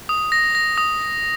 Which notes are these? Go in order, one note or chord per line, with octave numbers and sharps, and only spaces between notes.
D#6
A#6
A#6
D#6